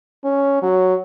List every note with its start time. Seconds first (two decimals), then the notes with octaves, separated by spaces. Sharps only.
0.25 C#4
0.63 F#3